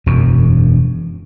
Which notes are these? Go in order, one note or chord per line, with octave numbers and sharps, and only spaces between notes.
E1 F#2